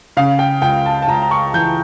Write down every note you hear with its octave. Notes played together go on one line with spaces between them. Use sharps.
C#3 F5
G5
C#2 G5
A5
A5
C#2 A#5
A#5
C#6
E3 G6